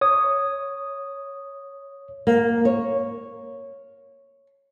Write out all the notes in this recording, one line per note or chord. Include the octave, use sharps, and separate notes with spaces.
C#5 D#6
A#3
C#5